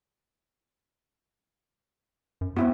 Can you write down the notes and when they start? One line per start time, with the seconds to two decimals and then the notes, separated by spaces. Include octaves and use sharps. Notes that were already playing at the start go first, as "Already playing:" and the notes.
2.41 F#2
2.56 B3 C4 E4 F#4